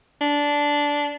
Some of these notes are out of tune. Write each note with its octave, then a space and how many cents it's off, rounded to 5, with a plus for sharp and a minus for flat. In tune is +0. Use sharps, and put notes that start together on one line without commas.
D4 -10